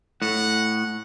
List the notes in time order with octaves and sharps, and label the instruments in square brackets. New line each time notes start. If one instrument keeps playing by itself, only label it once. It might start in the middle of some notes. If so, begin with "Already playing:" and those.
[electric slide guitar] A2 [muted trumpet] F#5